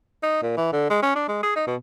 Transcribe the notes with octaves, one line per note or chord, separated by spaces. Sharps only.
D#4
A#2
E3
D3
G#3
C#4
D4
G#3
G#4
D#4
B2